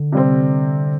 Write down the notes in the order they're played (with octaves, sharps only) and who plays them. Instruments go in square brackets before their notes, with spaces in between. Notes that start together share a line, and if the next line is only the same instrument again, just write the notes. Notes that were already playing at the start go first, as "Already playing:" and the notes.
Already playing: [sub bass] D3
[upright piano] C3 G3 C4